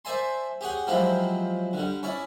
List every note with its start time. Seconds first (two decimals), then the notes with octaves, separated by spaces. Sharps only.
0.05 C5 D5 E5 G#5 A5 C6
0.61 G4 G#4 C#5 F#5
0.87 F3 F#3 G#3 C4 E4 G4
1.73 D3 G3
2.03 C#4 E4 C#5 D5